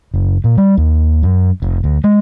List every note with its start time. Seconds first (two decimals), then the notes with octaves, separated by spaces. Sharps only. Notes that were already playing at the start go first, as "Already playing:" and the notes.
0.14 F#1
0.44 A#2
0.58 G3
0.77 D#2
1.23 F#2
1.62 F1
1.84 D2
2.04 G#3